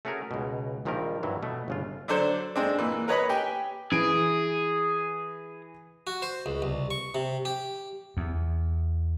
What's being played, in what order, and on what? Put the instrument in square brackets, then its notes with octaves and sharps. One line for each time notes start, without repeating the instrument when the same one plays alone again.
[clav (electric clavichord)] A3 C#4 F#4 G#4 A#4
C#2 B2
A#1 A#2 D#3 F3 G3 A#4
G2 E3 F#3
B2 A3
G1 C#3 F4
[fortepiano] D3 F#3 D4 A4 C5
G#3 C4 D4
A#2 E3
A#4 B4 C#5 D#5 A#5 B5
G4 G5 G#5
[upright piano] E3 D7 [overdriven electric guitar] G#4
[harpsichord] F#4
C5
C#2
C2
C#6
C3
G4
[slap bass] E2